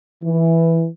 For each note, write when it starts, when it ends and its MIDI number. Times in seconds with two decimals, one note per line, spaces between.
0.24 0.87 52